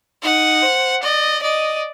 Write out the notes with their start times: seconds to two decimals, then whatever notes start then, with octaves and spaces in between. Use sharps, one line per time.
0.23 D#4 F#5
0.62 C5
1.03 D5 D#5
1.42 D5 D#5